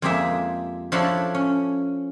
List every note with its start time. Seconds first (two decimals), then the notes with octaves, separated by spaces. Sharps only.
0.02 F2 G#3 A#3 G4 G#4 E5
0.92 F3 D4 E4 A4 C#5 B5
1.34 C#4